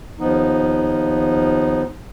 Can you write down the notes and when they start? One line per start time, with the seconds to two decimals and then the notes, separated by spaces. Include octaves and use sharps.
0.20 D#2 F3 B3 D#4